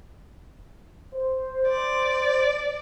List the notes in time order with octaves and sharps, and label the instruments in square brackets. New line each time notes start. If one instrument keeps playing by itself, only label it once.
[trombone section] C5
[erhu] D5